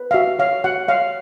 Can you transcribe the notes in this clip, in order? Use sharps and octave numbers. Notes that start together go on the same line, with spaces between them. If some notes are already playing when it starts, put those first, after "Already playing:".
Already playing: B4
F5
F#4 E5
C#5 F5
F#4 F#5
C#5 F5